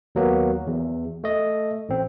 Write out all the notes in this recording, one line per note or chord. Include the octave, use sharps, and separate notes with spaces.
D#2 F#3 A#3 B3
E2
A3 D#5
A1 C4